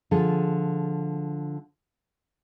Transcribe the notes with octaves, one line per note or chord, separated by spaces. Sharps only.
D3 F3 G#4 A4